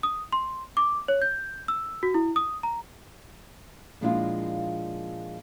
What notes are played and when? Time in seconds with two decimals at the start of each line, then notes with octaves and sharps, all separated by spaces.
0.03 D#6
0.33 C6
0.77 D6
1.08 C#5
1.22 G6
1.68 E6
2.03 F#4
2.14 E4
2.36 D#6
2.63 A#5
4.01 A#2 F3 G#3 D4 E4 F4